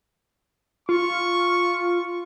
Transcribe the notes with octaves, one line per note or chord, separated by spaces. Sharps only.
F4 C#6